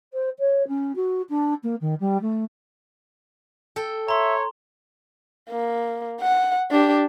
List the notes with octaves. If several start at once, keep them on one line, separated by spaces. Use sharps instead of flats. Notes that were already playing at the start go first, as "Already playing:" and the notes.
C5
C#5
C#4
F#4
D4
A#3
D#3
G3
A3
A4 G5
C#5 E5 A#5 C6
A#3
F#5
D4 G4